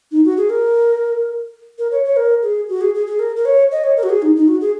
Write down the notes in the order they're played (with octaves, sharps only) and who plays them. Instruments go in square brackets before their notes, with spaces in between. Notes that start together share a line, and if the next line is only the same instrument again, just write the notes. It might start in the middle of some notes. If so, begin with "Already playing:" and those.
[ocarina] D#4
F#4
G#4
A#4
A#4
C#5
C#5
A#4
G#4
F#4
G#4
G#4
G#4
A#4
A#4
C#5
D#5
C#5
A#4
F#4
G#4
D#4
D#4
F#4
G#4